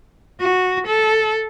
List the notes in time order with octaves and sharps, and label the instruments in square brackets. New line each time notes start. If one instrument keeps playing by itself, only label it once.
[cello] F#4
A4